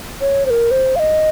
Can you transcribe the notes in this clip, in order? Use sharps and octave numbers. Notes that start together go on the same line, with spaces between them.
C#5
C5
A#4
C5
F5
D#5